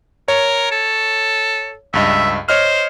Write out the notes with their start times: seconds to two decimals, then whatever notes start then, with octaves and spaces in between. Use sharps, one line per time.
0.28 A#4 C#5
0.72 A4
1.93 C#2 G2 D#5 E5
2.49 C5 C#5 D#5 F6